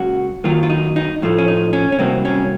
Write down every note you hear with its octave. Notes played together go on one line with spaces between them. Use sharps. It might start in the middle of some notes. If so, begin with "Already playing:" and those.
Already playing: C#2 C#3 F#3 A#3 F#4
F#2 D#3 F#3 A#3 F4
F4
D#4
D#4
A2 F3 A3
C#4
D#4
C#4
C#4
C2 C3 F#3 A#3 C4
C#4